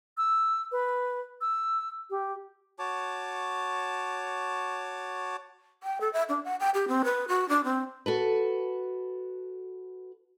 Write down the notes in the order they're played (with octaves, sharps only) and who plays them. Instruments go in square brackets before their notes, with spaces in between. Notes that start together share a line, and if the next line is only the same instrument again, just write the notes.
[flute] E6
B4
E6
G4
[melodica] F#4 C#5 A5 D6
[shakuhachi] G5
A4
E5
D4
F#5
G5
G4
C4
B4
F#4
D4
C4
[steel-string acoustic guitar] F#4 A4 B4